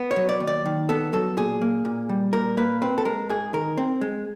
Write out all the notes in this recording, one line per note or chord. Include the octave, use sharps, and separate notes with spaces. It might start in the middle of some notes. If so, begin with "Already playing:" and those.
Already playing: B3
C#5
F#3
D5
D#2
D5
D#3
B3 A4
F#3 A4
A#2 G#4
A#3
A#2
G3
A#2 A#4
A#3 B4
C4 B4
A4
G#3 A#4
G#2 G#4
D#3 A#4
C4
G#3